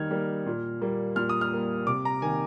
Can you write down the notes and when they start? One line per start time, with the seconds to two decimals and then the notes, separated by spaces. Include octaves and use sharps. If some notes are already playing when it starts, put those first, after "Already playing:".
Already playing: D#3 G3 A#3 F6 G#6
0.10 G3 A#3
0.46 A#2
0.81 G3 A#3
1.16 A#2 F6
1.29 D#6
1.41 F6
1.52 G3 A#3
1.87 C3 D6
2.05 A#5
2.22 D#3 A#3 G#5